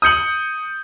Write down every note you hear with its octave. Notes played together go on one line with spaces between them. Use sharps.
D#6 G6 C#7 F#7